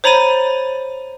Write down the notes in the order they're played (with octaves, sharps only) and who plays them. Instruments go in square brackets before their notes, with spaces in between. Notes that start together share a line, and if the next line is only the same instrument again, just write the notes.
[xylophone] C5 C#5 A#5 B5 A6 D#7